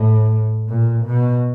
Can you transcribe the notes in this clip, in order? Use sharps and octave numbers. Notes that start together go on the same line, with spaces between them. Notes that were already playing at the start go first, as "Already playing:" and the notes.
Already playing: A2
A#2
B2